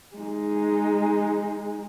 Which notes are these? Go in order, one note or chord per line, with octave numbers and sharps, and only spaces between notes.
G#3 D#4